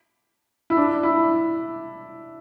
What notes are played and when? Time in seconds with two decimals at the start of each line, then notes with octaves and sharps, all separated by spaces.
0.70 E4
0.77 D4
1.03 E4